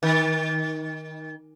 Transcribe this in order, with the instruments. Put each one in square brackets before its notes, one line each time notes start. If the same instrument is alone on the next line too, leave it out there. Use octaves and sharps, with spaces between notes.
[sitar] D#3